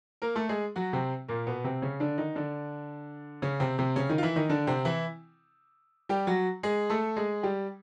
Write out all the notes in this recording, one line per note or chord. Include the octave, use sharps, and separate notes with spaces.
A#3 A#4
A3 A4
G#3 G#4
F#3 F#4
C3 C4
A#2 A#3
B2 B3
C3 C4
C#3 C#4
D3 D4
D#3 D#4
D3 D4
C#3 C#4
C3 C4
C3 C4
C#3 C#4
D#3 D#4
F4
E3 E4
D#3 D#4
D3 D4
C3 C4
E3 E4
G3 G4
F#3 F#4
G#3 G#4
A3 A4
G#3 G#4
G3 G4